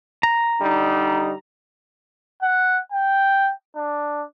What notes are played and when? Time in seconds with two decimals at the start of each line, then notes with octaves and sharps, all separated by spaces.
0.23 A#5
0.61 D3 G3 D#4
2.43 F#5
2.92 G5
3.77 D4